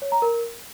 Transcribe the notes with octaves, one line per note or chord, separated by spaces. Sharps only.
C#5
A#5
A#4